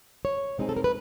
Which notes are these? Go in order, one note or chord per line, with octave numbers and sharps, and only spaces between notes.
C#5
B2 G#3 C4 D#4 G#4
A4
A#4
B4